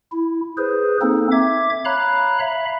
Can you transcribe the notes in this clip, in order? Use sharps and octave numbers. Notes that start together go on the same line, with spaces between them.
E4
G#4 B4 C5
A#3 C4 D#4 A4
E5 D6 G#6
C#5 F5 A#5 B5 F#6
E5 F5 B5